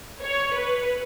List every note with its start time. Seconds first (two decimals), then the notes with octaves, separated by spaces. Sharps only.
0.23 C#5
0.53 B4